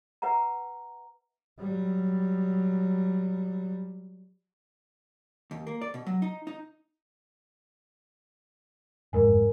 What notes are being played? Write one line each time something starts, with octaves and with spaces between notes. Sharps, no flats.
B4 E5 F#5 A#5
F#3 G3
D#2
A#3
D5
B2
F#3
D#4
D#4
F#1 F2 G#2 A#4 G#5